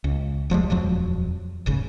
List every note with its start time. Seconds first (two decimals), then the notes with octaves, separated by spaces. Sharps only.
0.04 C#2
0.50 E1 F3 G3 G#3
0.70 D#1 F2 F3 F#3
1.66 D#1 G#1 C#3